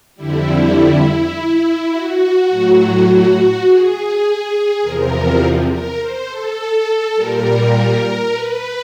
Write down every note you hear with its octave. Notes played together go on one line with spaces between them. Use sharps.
F2 D3 G3 E4
F#4
A2 F#3
G#4
E2 C3 F3 A#4
A#4
C5
A4
A#2 G3 A#4
B4